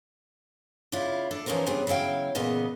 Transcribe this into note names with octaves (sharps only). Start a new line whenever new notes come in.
C#3 D4 E4 F4
D4 A4
E3 F3 C#4 D#4 A#4 C5
C#3 G3 B3 C4 D4
C#3 F#3 E4 F5 G5
E2 A#2 C#3 B3 D#5